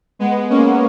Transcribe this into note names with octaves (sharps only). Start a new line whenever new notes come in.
G#3 B3
A#3 C#4